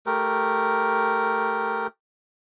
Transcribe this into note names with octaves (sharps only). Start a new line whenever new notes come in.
A3 G4 A#4